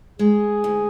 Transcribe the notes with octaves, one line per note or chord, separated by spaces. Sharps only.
G#3 G#4
D2